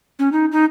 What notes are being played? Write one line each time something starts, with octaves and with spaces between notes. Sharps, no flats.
C#4
D#4
D#4